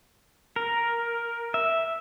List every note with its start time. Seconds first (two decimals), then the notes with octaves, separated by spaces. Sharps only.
0.56 A#4
1.54 E5